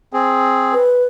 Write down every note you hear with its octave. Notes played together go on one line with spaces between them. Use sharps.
C4 G#4
B4